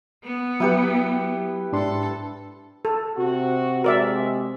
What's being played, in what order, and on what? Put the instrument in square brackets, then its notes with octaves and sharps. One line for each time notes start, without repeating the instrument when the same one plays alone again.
[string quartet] B3
[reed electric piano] F#3 [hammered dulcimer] E4 G4 B4
[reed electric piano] G#2 D4 C6 [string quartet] A4
[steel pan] A4
[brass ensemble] C3 F#4
[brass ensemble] C3 G#3 [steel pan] A#4 D5 E5